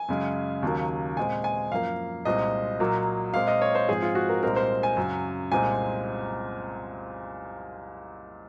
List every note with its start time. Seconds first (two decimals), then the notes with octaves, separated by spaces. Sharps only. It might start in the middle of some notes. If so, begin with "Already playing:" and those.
Already playing: G#5
0.08 F#2 C#3 G#3
0.63 D#2 C#3 F#3 A#3
1.17 A#2 G#3 C4 G#5
1.44 G#5
1.72 F#2 F3 A#3 F5
2.25 C2 A#2 G#3 C4 D#5
2.80 A#2 F#3 A#3
3.34 A#2 G#3 C4 F5
3.47 D#5
3.62 C#5
3.75 C5
3.89 G#2 F3 C4 G#4
4.02 F4
4.15 F#4
4.29 A#4
4.43 C2 A#2 G#3 C4 A#4
4.56 C5
4.83 G#5
4.97 F#2 C#3 F#3
5.52 C2 A#2 G#3 C4 G#5